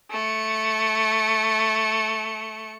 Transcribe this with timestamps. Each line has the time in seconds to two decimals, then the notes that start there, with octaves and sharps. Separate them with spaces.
0.11 A3 C#7